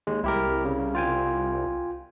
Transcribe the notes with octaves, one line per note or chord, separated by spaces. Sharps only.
D#2 G#3
C2 E4 G4 A#4
C#3
F4 G5 G#5